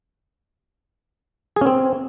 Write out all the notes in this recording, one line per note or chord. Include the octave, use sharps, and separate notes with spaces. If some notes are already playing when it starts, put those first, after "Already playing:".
G#4
C#4
C4